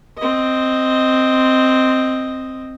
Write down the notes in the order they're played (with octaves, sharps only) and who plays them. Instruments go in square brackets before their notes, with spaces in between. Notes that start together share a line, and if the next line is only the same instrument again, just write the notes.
[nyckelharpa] C4 D#5